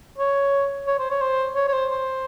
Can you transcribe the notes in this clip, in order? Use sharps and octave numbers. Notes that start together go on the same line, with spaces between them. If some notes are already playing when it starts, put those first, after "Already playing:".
C#5
C#5
C5
C#5
C5
C#5
C#5
C5
C5